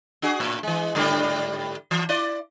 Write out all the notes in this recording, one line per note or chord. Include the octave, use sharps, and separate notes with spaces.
D4 F#4 G#4
A2
E3 G#3
G#2 D3 G3
E3
E4 D5